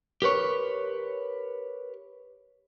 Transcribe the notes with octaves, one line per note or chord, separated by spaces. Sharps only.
G4 A#4 B4 C#5